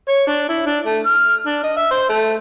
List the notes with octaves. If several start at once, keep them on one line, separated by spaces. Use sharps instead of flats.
C#5
D4
E4
D4
A3
F6
D4
D#5
E5
C5
A3